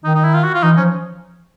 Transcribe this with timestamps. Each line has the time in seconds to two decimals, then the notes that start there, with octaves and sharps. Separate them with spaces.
0.04 D#3 D#4
0.15 D#4
0.24 E4
0.34 F4
0.43 F#4
0.54 F4
0.63 E3 D#4
0.77 F3 C#4